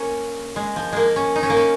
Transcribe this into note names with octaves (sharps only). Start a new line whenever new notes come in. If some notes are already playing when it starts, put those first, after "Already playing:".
Already playing: A#3 C#4
G#3
F3
G#3 A#3
C#4
D#4
C#4
A#3
C#4